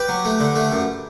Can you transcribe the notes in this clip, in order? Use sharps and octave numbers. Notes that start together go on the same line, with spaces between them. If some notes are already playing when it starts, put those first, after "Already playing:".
Already playing: G4 B4
F#3
A3
D3
A3
F#2